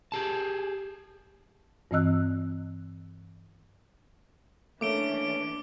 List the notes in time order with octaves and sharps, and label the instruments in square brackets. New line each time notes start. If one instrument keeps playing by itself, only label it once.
[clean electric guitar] G4 G#4 A5
[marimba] G2 E3 C4 D#5 E6 F#6
[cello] E3 D4 [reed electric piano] A3 A#3 [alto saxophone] C#4 [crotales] D6 D7 G7